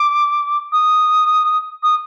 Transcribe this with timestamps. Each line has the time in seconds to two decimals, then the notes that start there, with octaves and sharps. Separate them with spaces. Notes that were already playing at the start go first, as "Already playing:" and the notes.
Already playing: D6
0.72 D#6
1.83 D#6